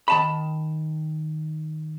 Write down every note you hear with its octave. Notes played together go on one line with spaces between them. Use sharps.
D#3 A5 B5